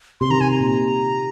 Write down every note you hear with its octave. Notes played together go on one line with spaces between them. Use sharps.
C3 C6
D#3 A#5
C3 G#5
A#5
A#2